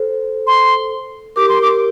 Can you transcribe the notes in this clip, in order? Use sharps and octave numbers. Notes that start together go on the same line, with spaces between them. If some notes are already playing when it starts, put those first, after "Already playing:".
Already playing: A4 C5
C6
G4 A#4 D6
C6
D6